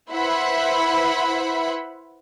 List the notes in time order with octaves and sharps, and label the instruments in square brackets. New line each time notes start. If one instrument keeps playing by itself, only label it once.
[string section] E4 B4 C5 E5 F#5 B5